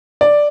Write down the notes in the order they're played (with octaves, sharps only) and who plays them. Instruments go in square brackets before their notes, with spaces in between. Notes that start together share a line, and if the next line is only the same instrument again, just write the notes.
[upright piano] D5